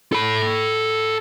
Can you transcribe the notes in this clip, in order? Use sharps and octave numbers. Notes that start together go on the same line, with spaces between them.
A4 B5